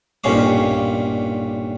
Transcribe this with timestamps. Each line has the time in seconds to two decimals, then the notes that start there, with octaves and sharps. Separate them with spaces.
0.24 B1 G2 A#2 C#4 F5 D6